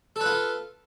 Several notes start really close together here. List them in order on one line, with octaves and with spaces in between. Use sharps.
A4 B4 F4